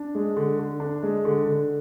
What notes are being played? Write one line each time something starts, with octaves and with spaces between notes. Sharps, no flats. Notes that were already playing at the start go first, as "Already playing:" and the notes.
Already playing: D4
G#3
D3
D3
D4
G#3
D3
D3